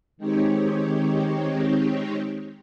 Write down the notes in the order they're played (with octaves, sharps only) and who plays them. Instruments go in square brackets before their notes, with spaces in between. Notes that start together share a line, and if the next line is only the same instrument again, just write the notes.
[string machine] D#3 G#3 C4 D#4 G4 C#5